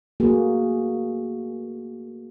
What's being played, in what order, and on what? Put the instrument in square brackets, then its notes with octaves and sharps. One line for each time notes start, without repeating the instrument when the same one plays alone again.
[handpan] A3 A#3 F#4 G#4